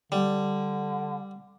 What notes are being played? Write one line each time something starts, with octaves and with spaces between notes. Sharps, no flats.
D3 G3